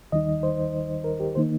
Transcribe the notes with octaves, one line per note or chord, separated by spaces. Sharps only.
D#2 D#3 G3 D#4 D#5
C5
A#4
G4
D#3 A#3 D#4 C5